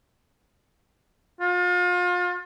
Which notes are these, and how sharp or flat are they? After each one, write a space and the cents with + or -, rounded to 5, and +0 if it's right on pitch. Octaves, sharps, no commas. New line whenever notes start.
F4 +35